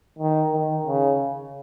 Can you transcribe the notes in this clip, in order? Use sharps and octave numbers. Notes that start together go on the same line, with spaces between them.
D#3
D#3
C#3